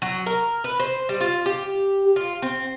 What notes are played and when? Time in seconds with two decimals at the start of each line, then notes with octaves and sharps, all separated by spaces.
0.02 F#3
0.26 A#4
0.64 B4
0.80 C5
1.09 G3
1.21 F4
1.46 G4
2.16 F4
2.42 C4